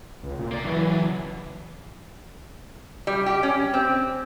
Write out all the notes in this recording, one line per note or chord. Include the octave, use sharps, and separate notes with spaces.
C#2
A#2
A#3 D5
C#3 E3 F#3
G3
G4
C#4
C4